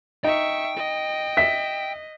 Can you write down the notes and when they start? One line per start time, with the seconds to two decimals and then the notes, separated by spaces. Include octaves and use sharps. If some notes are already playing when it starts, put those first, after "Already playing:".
0.24 D#4 E5 G5 C#6
0.77 D#5
1.37 E5 B6